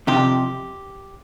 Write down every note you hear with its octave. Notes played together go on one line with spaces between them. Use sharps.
F2 C3 F3 G4